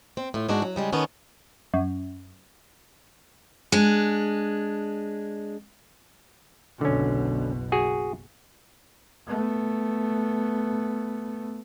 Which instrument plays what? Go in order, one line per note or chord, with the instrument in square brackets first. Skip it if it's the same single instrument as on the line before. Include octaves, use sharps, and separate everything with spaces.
[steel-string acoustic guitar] C4
A2 F4
G#2 G#3 D4 F#4
F#3
C#3 G3 G#3
D#3 B3 C#4 A4
[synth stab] F#2
[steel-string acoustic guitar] G#3 D4
[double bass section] F#1 B1 B2 [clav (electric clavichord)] D3 C#4
[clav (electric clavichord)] F#4 G#4
[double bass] A3 B3